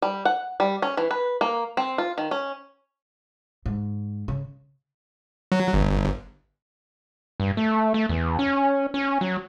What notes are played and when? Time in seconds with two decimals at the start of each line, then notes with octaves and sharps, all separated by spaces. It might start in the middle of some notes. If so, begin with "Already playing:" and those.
0.02 G3
0.25 F#5
0.60 G3
0.82 C#4
0.97 E3
1.11 B4
1.41 A#3
1.77 C4
1.98 F4
2.18 D#3
2.31 C#4
3.66 G#2
4.28 C#3
5.52 F#3
5.73 G1
7.40 G2
7.57 A3
7.94 A3
8.09 E2
8.39 C#4
8.94 C#4
9.21 F#3